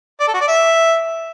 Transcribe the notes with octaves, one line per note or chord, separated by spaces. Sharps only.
D5
A4
F#4
D5
E5